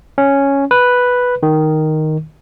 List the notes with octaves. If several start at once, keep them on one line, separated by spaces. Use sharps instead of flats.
C#4
B4
D#3